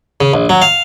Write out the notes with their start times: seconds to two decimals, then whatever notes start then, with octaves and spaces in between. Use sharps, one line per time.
0.21 C#3
0.34 A#1
0.49 F#3
0.62 F5